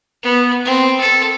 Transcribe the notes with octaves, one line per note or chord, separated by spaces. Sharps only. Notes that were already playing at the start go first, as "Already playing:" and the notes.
B3
C4
A4